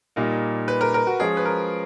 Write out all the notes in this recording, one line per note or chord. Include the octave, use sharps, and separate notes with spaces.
A#2 G3 A#3 D#4
B4
A#4
A#4
F#4
F3 G#3 C#4 F4 G#4
B4
A#4